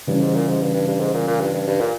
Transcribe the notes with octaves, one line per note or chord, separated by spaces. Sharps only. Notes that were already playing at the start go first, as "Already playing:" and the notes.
G2 C#3 E3 G3 C#4
G#2
A#2
G#2
G2
G2
G2
G#2
A#2
A#2
G2
G2
G2
A#2